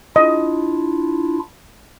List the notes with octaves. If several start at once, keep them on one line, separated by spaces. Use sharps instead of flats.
D4 E4 F4 D#5